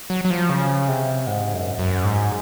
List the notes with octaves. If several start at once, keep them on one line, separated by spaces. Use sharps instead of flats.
F#3
F#3
F3
C#3
C3
G#2
F#2
F#2
G#2